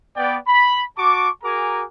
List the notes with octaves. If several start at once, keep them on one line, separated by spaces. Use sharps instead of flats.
B3 D5 G5
B5
F#4 A5 C#6 D6
F#4 G#4 A#4 G#5 A#5 D6